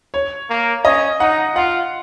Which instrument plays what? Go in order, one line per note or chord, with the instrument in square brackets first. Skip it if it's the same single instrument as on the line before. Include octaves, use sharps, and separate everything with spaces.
[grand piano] C#5
[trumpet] A#3
[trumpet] C#4 [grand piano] D#5
[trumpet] D#4 [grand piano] F#5
[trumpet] F4 [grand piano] F#5